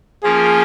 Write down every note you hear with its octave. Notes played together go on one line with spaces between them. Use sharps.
F3 A#3 C#4 F4 G#4 A#4